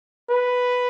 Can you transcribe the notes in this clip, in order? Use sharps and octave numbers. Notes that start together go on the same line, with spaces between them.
B4